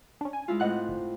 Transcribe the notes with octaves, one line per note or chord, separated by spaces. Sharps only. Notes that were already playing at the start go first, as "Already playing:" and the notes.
C#4 D4
G#5
G#3 E4 F4
A2 C4 D#5 F#5 F#6
G1